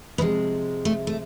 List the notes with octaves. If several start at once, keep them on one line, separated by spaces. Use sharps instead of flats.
C3 F3 G#3 B3
A3
A3